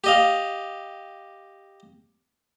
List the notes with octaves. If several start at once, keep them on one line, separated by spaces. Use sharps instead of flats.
G4 D#5 F5